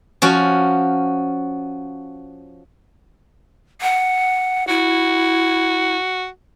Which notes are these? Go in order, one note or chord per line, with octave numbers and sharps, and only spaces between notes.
F3 C#4 F#4
F#5
E4 F#4